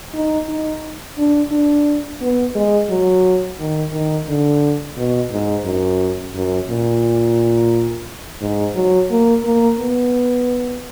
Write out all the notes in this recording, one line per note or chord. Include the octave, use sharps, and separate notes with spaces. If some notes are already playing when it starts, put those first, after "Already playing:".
D#4
D#4
D4
D4
B3
G#3
F#3
D#3
D#3
D3
B2
G#2
F#2
F#2
A#2
G#2
F#3
A#3
A#3
B3